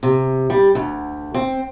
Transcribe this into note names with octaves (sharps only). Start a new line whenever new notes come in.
C3
G3
D2
C4